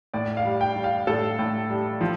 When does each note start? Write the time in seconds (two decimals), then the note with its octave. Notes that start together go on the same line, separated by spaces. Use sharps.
0.14 A2 D5
0.37 F5
0.45 G3
0.61 G5
0.76 G3
0.84 F5
1.07 A2 A4
1.39 A2
1.70 G3
2.01 F3